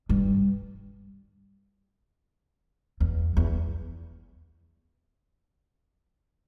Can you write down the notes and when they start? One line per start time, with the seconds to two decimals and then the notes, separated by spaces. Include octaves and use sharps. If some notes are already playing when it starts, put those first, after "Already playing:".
0.09 G2
3.00 E2
3.37 E2